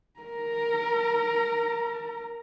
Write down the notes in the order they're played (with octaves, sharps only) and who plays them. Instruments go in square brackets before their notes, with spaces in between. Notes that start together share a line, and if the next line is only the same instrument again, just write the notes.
[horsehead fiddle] A#4 A#5